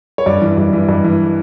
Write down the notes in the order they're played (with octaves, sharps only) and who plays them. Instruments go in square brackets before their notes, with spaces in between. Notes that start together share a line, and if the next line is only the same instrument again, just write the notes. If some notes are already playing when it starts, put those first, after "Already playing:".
[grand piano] C#5
G2 D5
E3
G2
E3
G2
E3